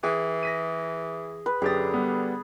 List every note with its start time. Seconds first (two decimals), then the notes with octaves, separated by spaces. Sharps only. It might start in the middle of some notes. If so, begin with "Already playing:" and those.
0.03 E3 G#4
0.43 A#6 B6 D#7
1.46 B4
1.62 F#2 D3 G4 G#4 D#6 A6
1.94 G3 B3